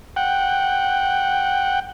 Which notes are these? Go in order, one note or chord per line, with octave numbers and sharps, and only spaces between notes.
F#5 G5